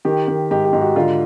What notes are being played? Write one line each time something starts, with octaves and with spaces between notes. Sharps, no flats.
D#3 G4
D#3
G#2 G4
G4
G#2
F#4
D3 F4